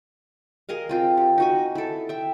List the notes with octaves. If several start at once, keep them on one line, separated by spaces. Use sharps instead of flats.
G#4 A#4 D#5 F5
C4 F4 G5
G4
D#4 F#4 G#5
E4 A4
E5 G5